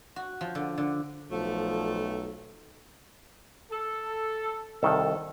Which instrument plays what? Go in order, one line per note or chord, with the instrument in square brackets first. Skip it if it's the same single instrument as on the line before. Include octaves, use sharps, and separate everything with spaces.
[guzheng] F#4
F3
D3
D3
[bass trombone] B1 [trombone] F3 [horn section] A3
[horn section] A4
[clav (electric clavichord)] C2 D#3 [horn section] A4